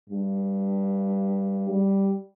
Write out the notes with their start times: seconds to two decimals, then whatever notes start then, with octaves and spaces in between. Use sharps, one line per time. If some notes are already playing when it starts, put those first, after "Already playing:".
0.10 G2
1.69 G3